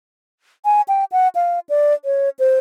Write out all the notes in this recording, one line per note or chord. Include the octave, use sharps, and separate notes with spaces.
G#5
G5
F#5
F5
D5
C#5
C5